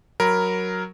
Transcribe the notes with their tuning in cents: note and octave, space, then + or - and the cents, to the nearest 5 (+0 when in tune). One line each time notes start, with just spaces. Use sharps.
F#3 +0 A#4 +0 B5 +0